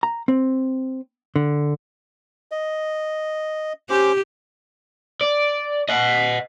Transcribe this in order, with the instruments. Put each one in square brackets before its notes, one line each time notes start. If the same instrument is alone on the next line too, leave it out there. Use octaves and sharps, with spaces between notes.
[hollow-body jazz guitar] A#5
C4
D3
[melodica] D#5
[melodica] C#4 C5 D6 [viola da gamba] G4
[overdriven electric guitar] D5
D#5 F#5